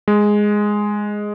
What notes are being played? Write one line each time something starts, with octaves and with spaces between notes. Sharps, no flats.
G#3